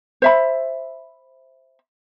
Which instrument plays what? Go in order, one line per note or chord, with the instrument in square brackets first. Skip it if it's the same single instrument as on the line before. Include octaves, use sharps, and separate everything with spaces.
[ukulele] C5 E5 B5